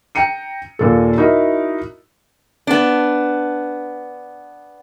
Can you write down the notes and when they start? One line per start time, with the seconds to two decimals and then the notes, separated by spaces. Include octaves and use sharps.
0.15 G5 A#5 C#7 D#7
0.79 D#2 A#2 A4
1.18 D#4 E4 F#4 A#4 D#5 E5
2.67 B3 D4